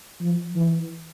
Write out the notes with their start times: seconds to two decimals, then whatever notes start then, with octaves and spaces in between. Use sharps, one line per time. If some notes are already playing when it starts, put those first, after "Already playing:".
0.21 F3
0.56 E3